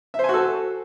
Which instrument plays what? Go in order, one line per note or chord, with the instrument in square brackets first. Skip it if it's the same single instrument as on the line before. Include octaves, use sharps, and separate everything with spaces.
[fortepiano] E5
C5
G#5
F#4
A4